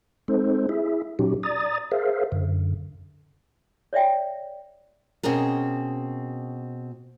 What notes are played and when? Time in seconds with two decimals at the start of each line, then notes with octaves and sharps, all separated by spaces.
0.28 G#3 C4 D#4 A4 C5
0.69 E4 G#4 E5
1.19 A#2 F#3 C#4 D#4 F#4 G4
1.43 D5 A#5 D#6 A6
1.92 G#4 A#4 C5 E5 F5
2.32 F#2 D3
3.93 C#5 D5 E5 G5
5.23 B2 C4 C#4 G#4 A#4